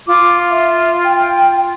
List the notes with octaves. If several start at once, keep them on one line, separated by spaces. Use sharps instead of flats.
F4 D6
E5
G5